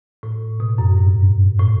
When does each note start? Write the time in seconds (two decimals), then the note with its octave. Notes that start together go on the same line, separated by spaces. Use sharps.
0.23 A2
0.60 B2
0.78 F#2
0.97 G2
1.59 A2